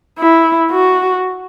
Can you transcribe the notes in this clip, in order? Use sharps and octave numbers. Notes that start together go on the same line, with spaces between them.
E4
F#4